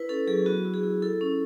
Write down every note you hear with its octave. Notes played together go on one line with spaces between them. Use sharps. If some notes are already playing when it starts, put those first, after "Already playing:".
Already playing: E4 B4
C#4 A4
F#3 G#4
B3 F#4
E4
G#4
E4
E4 A4
C#4